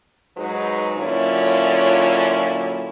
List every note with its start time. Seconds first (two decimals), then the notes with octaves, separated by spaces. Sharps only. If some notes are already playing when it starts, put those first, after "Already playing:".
0.37 G#2 F#3 D#4 G#4 B4
0.97 A#2 D3 F#3 C#4 E4 F4